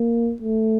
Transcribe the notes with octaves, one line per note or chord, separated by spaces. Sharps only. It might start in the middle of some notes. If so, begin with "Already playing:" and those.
Already playing: A#3
A3